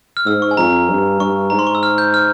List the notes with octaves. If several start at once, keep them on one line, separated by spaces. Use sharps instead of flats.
F6
G#2 E6
C#6
G#5
F2 A#5
G2
G2 C#6
G#2 A#5
C6
C#6
E6
F6
G6
F6